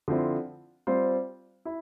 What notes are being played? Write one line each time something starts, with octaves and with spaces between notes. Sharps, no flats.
D3 F3 C4 E4
G3 C4 F4 C5
E4